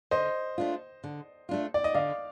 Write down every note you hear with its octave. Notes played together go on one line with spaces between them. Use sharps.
D3 C5 D#5
A3 D4 F4
D3
A3 D4 F4
D5
D#5
D3 D5 F5